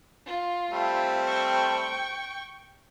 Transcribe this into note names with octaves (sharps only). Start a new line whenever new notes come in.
F4
G3 A3 C4
G5 C#6